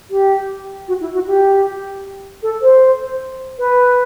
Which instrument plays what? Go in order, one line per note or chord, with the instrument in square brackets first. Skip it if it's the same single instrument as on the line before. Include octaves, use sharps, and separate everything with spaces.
[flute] G4
F#4
E4
F#4
G4
A4
C5
B4